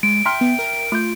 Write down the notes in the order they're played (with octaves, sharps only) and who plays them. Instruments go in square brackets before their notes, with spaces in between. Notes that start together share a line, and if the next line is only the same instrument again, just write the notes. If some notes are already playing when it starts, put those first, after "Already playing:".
[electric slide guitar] G#3 [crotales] D7
[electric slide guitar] E5 G5 [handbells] A#5 C6 F6 [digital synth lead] C#7
[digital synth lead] B3
A#4
[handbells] A3 G6 [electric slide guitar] F4